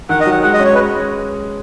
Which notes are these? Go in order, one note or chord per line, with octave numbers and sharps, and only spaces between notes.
D#3 F#5
D#5
F#3 F#5
G#3 F#5
D#5
C#4
C#5
G#3 B4